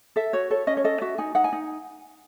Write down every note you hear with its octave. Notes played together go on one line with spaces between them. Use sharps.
A4 E5
F#4 C#5
A4 C#5
C#4 D#5
C#5
A4 D#5
F#4 E5
D#4 G#5
D#4 F#5
G#5
D#4